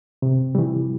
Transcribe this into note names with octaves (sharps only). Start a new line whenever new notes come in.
C3
E3 G3